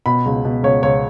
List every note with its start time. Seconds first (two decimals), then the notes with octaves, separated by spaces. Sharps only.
0.06 B2 B5
0.26 C#2
0.45 B2
0.63 C#2 C#5
0.83 C#2 C#5